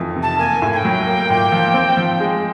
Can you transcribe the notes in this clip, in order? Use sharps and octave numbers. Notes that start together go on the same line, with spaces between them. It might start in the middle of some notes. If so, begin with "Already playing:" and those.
Already playing: F2 D#3 E3
C3
A5
A#3 G#5
A2
G#5
G5
F#3
A#3
A#2
F3
C4
F3
G#3